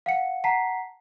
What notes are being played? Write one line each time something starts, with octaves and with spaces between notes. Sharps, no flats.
F5 F#5 C#7
F#5 A5 A#5 B6 C7